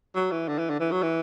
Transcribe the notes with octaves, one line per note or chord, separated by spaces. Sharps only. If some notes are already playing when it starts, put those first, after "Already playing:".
F#3
E3
D3
E3
D3
E3
F#3
E3